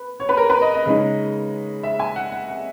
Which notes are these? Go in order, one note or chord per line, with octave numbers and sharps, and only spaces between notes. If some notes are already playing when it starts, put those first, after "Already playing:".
Already playing: B4
C#5
B4
A#4
B4
D#5
D#5
C#3 G#3 D#4
E5
G#5
F#5
F#5
F#5